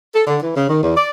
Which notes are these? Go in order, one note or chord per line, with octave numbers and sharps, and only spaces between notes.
A4
D3
E3
C#3
D#3
E2
D5